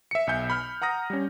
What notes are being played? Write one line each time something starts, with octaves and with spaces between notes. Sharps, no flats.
E5 C#7
B1 E5 G#5 G6
B5 F6 G6
F#5 A#5 D#6 A#6
G3 C#4